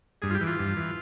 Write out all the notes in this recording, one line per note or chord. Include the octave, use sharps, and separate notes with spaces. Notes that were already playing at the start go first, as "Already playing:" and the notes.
G2 G#4
F4
G4
E3
F4
G2
E3